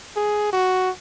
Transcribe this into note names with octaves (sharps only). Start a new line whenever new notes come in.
G#4
F#4